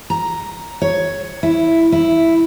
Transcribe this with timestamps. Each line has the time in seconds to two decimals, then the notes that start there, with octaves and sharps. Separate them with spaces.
0.10 A#5
0.82 C#5
1.43 E4
1.92 E4